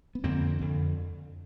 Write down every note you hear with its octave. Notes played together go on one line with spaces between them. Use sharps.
B3
F2 D3 A#3 C4
F2 D3